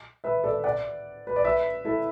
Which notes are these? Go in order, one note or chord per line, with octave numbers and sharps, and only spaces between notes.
B4 E5
A4 D5
D5 F#5
B4
D5
B4 E5
E4 A4